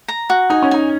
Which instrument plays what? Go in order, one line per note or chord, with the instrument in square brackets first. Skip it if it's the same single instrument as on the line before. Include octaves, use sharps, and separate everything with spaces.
[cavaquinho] A#5
F#4
[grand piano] D#4 [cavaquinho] G#5
[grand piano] C#4
[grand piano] D#4 [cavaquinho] G#5